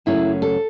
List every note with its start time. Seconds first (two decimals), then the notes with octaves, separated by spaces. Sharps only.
0.06 F#2 C#3 F#3 A3 C#4 E4
0.42 A4